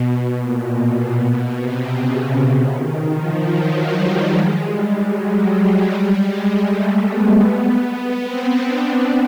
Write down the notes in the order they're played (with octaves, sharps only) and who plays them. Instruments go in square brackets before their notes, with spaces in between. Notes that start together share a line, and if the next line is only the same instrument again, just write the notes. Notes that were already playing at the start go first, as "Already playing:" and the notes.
Already playing: [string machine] B2
A#2
B2
C3
C#3
C#3
D#3
F3
F#3
G3
G#3
G3
F#3
G3
G#3
A3
B3
B3
C4
D4